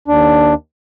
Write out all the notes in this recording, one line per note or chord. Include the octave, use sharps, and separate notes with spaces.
D#2 D4